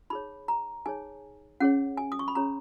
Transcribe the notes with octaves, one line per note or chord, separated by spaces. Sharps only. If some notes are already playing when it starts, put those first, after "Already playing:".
D#4 G#4 C#5 B5
A#5
D#4 G#4 C#5 G#5
C#4 G#4 C#5 F#5
G#5
D#6
C#6
B5
C#4 G#4 C#5 A#5